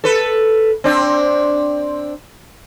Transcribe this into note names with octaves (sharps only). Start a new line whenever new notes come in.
A4 B4
C4 D4